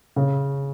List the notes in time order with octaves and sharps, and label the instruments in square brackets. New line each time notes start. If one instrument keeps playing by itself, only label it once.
[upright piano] C#3